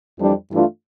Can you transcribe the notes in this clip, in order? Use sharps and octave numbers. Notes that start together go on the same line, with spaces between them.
F2 E3 G3 D4
G2 E3 A3 D4 F4